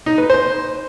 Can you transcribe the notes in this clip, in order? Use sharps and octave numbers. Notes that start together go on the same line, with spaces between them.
D#4
B4
C5